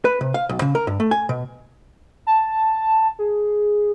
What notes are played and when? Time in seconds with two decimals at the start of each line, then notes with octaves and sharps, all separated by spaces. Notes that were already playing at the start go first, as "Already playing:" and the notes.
0.05 B4
0.21 C3
0.34 F5
0.49 B1
0.62 C#3
0.75 A#4
0.87 G2
1.00 A3
1.11 G#5
1.29 B2
2.27 A5
3.19 G#4